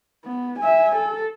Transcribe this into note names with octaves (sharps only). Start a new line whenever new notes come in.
B3
E5 G#5
A4